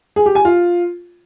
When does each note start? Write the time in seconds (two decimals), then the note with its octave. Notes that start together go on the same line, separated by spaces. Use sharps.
0.16 G#4
0.26 G4
0.35 G#5
0.45 F4